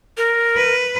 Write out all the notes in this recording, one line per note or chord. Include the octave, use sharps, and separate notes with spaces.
A#4
B4